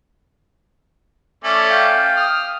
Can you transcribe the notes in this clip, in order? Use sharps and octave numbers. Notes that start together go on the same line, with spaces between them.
A3 C#4 D5
F5 G5
D#6 F6